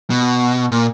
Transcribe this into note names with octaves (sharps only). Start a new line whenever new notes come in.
B2
A#2